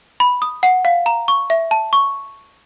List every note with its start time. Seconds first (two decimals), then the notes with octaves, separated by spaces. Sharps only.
0.20 B5
0.42 D#6
0.63 F#5
0.85 F5
1.06 A#5
1.28 C#6
1.50 E5
1.71 A5
1.93 C#6